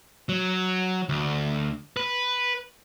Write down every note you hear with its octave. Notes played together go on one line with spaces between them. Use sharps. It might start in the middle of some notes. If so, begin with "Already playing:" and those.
F#3
D2
B4